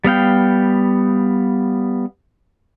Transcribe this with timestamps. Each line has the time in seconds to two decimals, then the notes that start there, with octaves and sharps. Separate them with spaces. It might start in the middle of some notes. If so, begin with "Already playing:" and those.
0.04 G3 B3 F5 G5